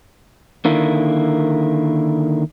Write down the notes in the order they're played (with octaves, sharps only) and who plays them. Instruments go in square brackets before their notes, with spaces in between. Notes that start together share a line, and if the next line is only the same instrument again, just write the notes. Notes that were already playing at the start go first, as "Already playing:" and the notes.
[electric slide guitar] D3 D#3 A#3 E4